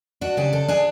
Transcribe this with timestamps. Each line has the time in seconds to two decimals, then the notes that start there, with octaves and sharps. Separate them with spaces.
0.21 D4 F#4
0.37 C#3 G4
0.53 D4 A4
0.68 D4 G#4